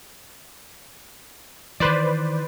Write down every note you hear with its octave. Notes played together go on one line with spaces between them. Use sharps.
D#3 E3 B4 C5 D5